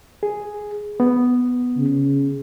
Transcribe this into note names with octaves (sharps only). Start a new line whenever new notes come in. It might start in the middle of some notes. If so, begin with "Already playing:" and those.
G#4
B3
C#3